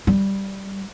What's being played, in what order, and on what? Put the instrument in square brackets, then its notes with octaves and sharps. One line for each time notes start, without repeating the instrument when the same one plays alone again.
[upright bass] G3